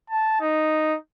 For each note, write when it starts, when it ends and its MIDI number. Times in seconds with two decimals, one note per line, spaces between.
0.10 0.38 81
0.41 0.96 63